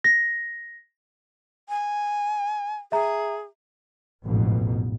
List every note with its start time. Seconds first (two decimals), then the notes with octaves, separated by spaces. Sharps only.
0.04 A#6
1.69 G#5
2.92 G#4 E5 A#5
4.25 A1 F2 G#2 B2